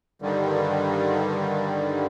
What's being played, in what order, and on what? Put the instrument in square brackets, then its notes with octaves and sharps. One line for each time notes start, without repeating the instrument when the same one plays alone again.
[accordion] G2 D3 D#3 G3